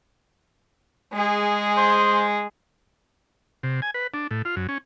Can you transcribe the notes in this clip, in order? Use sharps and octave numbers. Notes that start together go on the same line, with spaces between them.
G#3 G#4
C5
C3
G#5
B4
D4
A2
F4
F#2
C#4